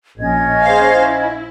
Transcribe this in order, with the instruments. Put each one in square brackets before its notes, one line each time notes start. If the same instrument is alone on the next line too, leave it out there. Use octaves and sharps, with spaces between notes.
[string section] A#1 [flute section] C#4 D#5 G#6
[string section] G#4 C5 F5
E4